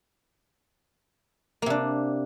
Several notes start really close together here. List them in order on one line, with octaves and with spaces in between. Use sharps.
A#3 C3 D4